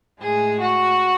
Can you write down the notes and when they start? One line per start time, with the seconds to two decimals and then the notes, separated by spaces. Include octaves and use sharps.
0.20 A2 G#3 G#4
0.60 F#4